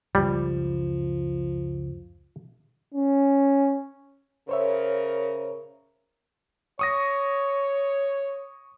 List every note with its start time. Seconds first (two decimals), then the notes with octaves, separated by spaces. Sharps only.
0.15 C#2 F#2 F3 G3
2.94 C#4
4.49 C#3 A#4 C5 C#5 E5
6.79 C#5 C#6 D#6 A#6